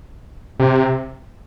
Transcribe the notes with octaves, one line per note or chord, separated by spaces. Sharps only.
C3